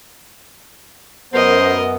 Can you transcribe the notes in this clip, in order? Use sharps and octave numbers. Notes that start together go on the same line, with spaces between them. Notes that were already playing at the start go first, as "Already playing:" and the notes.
F#2 B3 A#4 C5 D#5